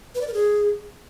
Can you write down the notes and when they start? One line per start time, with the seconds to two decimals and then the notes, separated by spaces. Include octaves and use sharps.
0.15 B4
0.21 D5
0.27 A#4
0.34 G#4